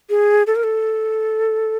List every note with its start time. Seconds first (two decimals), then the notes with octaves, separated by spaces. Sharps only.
0.10 G#4
0.47 A4
0.56 A#4
0.64 A4